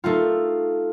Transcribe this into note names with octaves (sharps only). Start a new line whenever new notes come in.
A3 D#4 F4